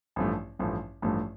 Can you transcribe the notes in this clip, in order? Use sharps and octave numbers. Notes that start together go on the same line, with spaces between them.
A1 G2 F3 A3
A1 G2 F3 A3
A1 G2 F3 A3